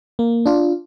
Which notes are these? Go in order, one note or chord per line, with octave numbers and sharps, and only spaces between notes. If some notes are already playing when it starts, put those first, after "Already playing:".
A#3
D4 F4